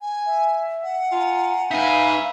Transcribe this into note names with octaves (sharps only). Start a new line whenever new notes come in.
G#5
E5
F#5
F4 G#5 A#5
D#4 B4 E5 F5 G#5 B5